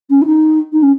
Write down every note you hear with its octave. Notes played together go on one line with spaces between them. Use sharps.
C#4
E4
D#4
D#4
C#4